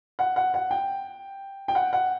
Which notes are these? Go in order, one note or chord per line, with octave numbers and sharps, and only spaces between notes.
F#5
F#5
F#5
G5
G5
F#5
F#5